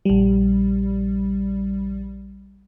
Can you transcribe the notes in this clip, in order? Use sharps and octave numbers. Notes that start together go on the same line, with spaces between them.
A#1 G3